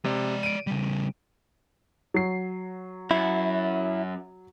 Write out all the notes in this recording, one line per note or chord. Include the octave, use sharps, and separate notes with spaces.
C3 G#3 D5
D7 D#7
C#3 G3
F#3 C7
F#2 E4